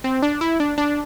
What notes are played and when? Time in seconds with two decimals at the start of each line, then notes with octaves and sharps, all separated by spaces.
0.04 C4
0.23 D4
0.41 E4
0.60 D4
0.78 D4